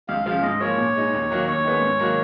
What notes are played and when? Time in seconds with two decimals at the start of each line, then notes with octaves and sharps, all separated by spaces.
0.08 C#2 F5
0.26 C#3 F3 F5
0.43 G#2 D#5
0.60 F3 A#3 C#5
0.77 A#2
0.96 G#3 D#4
1.13 D#2
1.31 D#3 F#3 A#3
1.48 D#2 C#5
1.64 D#3 G#3 B3
1.82 G#2
1.99 D#3 F#3 A#3